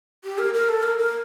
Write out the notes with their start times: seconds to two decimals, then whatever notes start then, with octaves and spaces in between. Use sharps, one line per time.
0.24 G4
0.39 A#4
0.54 A#4
0.69 A4
0.83 A#4
0.98 A#4